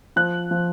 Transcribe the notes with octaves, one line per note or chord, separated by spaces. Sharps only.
F3 F#6
F3